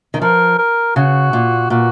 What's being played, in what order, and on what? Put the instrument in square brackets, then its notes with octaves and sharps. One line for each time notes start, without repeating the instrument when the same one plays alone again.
[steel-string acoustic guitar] D#3
[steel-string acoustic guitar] F3 [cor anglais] A#4
[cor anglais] A#4
[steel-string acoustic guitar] C#3 [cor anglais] F#4
[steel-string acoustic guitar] A#2
[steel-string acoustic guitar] A#2 [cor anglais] F#4